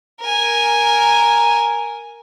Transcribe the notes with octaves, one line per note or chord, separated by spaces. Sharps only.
A#4 G#5